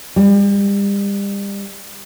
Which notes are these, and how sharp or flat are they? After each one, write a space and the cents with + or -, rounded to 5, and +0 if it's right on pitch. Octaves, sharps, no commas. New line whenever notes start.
G3 +35